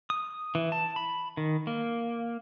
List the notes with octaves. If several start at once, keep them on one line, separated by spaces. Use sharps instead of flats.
D#6
E3
A5
B5
D#3
A#3